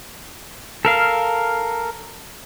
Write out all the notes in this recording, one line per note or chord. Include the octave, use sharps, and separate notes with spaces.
A4 A#4 F5